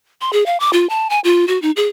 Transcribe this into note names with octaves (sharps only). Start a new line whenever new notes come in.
C6
G#4
F5
D6
F4
A5
G#5
F4
F#4
D#4
G#4